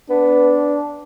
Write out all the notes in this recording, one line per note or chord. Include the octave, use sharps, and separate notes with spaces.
B3 D4